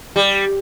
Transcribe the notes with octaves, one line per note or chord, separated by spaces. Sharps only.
G3